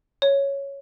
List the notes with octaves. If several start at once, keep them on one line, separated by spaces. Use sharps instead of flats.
C#5